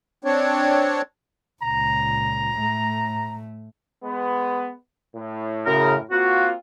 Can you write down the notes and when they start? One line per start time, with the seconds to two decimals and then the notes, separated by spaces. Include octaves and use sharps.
0.25 C4 D4 C#5
1.63 C#2 A#2 A#5
2.56 A2 A3
4.03 G#3 B3
5.15 A2
5.66 F#2 C#3 A#4
6.11 A#3 C4 F4 F#4